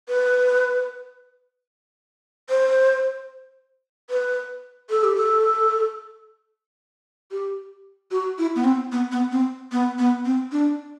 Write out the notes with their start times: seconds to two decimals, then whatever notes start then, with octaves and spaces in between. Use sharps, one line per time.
0.09 B4
2.50 C5
4.10 B4
4.90 A4
5.04 G4
5.16 A4
7.31 G4
8.11 F#4
8.38 E4
8.56 B3
8.64 C4
8.92 B3
9.12 B3
9.32 C4
9.72 B3
9.99 B3
10.25 C4
10.52 D4